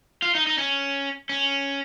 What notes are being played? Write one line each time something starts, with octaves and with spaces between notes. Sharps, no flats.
F4
D#4
D#4
C#4
C#4